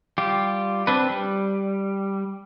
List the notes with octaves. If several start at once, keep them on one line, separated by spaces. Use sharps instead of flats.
G3 F4 G4
C4 D4 B4
G3